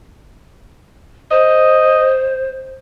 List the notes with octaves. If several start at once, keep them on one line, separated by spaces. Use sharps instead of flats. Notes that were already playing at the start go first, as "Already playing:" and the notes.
C5 D#5